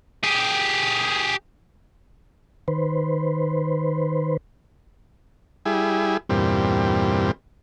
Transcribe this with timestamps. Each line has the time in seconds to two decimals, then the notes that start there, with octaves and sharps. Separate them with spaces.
0.23 G4 G#4
2.68 D#3 B4 C5
5.65 G3 E4 G#4
6.29 E2 G2 A#2 G3 C4